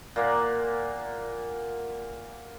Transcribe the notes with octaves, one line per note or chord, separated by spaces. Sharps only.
A#2 A#3 F#5